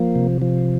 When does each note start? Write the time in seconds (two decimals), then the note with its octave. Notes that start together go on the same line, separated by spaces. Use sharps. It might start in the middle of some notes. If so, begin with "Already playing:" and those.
Already playing: F3 A#3
0.15 C3
0.42 F3